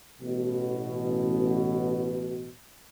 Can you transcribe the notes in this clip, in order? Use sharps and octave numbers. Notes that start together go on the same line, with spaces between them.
A1 B2